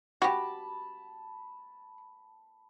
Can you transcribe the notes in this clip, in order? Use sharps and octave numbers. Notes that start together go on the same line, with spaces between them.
F#4 G4 A5 B5